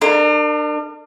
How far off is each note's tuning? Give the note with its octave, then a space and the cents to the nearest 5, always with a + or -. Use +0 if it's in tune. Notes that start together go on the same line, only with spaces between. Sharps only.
D4 +35 A#4 -25